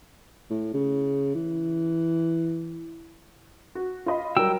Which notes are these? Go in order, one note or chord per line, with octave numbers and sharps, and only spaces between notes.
A2
C#3
E3
F#4
F4 D#5 B5
F#3 G3 A#4 G5 E6